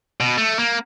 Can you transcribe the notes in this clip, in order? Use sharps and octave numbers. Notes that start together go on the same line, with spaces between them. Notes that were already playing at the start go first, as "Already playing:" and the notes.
B2
A3
A#3